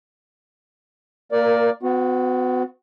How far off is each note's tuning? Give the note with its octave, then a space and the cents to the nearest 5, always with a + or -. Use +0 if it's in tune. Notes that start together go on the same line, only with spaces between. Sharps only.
A#3 -10 A#4 +15 D5 +0
B3 +40 F#4 -20